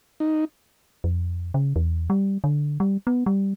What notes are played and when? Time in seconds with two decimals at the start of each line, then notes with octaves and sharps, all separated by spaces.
0.20 D#4
1.04 F2
1.54 C#3
1.76 E2
2.10 G3
2.44 D3
2.80 G3
3.07 B3
3.26 G3